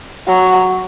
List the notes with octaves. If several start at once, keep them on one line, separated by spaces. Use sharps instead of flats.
F#3